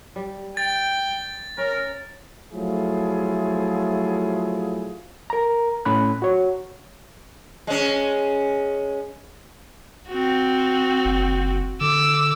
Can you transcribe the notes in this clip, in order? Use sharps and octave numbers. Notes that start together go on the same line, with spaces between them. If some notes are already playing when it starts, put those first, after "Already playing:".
G3
G5 A6
C#4 A#4
F3 F#3 A3 E4 F4 G#4
A#4 A#5
A2 C#4 B5 F#6
F#4 C#5
G#3 C#4
C4 F#4
F#1
D3 D6 E6